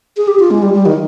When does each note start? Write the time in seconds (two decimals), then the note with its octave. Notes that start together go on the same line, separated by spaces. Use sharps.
0.17 G#4
0.28 G4
0.39 F4
0.51 G#3
0.62 G3
0.74 G3
0.86 D#3